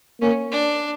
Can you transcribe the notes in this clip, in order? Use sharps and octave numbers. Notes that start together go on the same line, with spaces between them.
A#3 C#4
D4